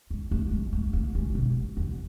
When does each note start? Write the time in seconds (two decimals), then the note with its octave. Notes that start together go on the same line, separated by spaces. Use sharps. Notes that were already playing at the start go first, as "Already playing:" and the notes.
0.10 G#3
0.31 A3
0.51 G#3
0.73 A3
0.93 A3
1.15 G#3
1.35 B2
1.77 E2